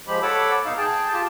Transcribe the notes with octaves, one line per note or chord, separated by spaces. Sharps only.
F3 G#3 G4 B5
A4 C#5 F#5 B5 D6 E6
B2 D#4 F5
G#4 G5 A5
F4 G4 A5